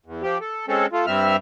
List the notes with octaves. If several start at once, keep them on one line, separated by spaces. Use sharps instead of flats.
E2
F3 G4
A4
G#3 C4 C#4 A4
A3 F4
G2 G3 C4 E5 F6